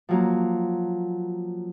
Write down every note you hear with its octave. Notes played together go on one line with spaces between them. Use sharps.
F3 F#3 A#3